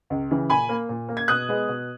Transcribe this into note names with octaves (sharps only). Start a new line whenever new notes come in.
C#2
C#3 E3
A#2 G#5 B5
A#3
A#2
A#3
G#6
B2 D#6 F#6
G#3 B3
B2